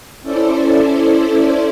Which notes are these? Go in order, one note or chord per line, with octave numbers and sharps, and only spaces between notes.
C#4 E4 A4 C5 D5